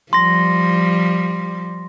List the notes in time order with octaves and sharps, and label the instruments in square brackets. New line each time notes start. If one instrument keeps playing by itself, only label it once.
[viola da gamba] F3 G3 [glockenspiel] C6 A#6